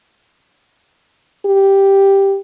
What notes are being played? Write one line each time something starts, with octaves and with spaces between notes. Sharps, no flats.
G4